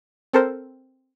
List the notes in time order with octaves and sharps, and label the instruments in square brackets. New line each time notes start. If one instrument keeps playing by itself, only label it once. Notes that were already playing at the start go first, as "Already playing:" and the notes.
[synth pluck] C4 A4 A#4 C5